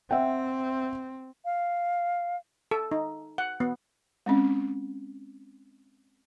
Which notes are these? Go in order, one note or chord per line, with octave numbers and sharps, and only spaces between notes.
C4 E5 F#5 G5
F5
A4
D#4
F#5
B3
G#3 C4 C#4